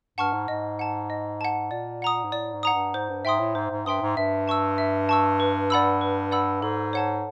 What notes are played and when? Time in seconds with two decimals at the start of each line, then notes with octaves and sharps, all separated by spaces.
0.18 G2 F#5 A5 C#6 F6
0.33 G#2
0.48 G#2 D#5
0.79 F#5 A5
1.10 D#5
1.41 F#5 A5
1.71 A#2 D5
2.02 F#5 A#5 D#6
2.24 G#2
2.32 A2 D5
2.53 G#2
2.63 F#5 A#5 D#6
2.73 G2
2.94 G#2 C5
3.09 G2
3.25 G#2 E5 G5 C6 D#6
3.39 A2
3.55 G#2 C5
3.71 G#2
3.86 G2 E5 G5 C6 D#6
4.01 G#2
4.17 G2 E5
4.48 A5 C#6 E6
4.78 E5
5.09 A5 C#6 E6
5.40 B4
5.70 D5 F#5 B5 E6
6.01 B4
6.32 D5 F#5 B5 E6
6.62 G#2 A4
6.93 C#5 F#5 A5